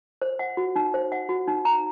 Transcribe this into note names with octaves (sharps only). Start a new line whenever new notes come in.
C5
F#5
F#4
D#4
C5
F#5
F#4
D#4
A#5